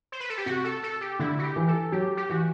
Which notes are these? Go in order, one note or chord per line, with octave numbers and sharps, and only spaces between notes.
C5
B4
A4
G4
C3 F#4
A4
A4
G4
D3 E4
F#4
G4
E3
A4
F#3 G4
G4
E3 F#4